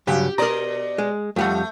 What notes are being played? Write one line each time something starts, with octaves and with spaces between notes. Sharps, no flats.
G2 C#3 F#3 G4
B2 A#4 D5 D#5 A#5
G#3
F2 G3 A3 F#5